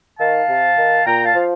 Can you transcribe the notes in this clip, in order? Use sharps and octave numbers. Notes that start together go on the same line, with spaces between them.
D#3 F5 A5
C3
D#3
A#2 G5 A#5
F5 A5
F3